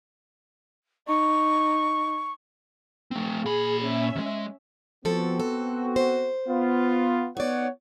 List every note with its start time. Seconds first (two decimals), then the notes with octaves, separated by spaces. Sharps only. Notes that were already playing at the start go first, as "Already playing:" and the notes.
1.08 D#4 C#6
3.11 A3 C4
3.46 A#2 G#4 B5
3.83 C#4 E5
4.16 D#2 G#3
5.05 F3 B3 C4 F#4 A4
5.40 A4
5.96 C5
6.48 B3 F4
7.37 B3 D#4 C#5 D5 F#5